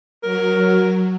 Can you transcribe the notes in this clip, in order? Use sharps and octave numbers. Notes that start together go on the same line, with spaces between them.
F#3 A#4